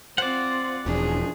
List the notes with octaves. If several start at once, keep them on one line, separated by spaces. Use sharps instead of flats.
C4 F4 C5 D5 F#5
E1 F3 C#4 D4 G#4